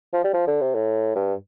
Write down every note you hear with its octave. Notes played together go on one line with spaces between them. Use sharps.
F3
G3
F3
D3
C3
A2
G2